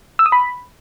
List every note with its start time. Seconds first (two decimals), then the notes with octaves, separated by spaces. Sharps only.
0.19 E6
0.26 D#6
0.32 B5